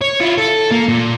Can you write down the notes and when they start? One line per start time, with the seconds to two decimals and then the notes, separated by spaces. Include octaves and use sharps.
0.02 C#5
0.21 E4 F4
0.38 A4
0.71 A#3
0.89 A#2